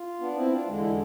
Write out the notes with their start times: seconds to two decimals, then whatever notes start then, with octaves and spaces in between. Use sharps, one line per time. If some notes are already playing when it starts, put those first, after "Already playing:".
Already playing: F4
0.20 B3 D4
0.36 C4 E4
0.51 D4 F4
0.66 E2 D3 G#3 D4
0.79 E4
0.90 D4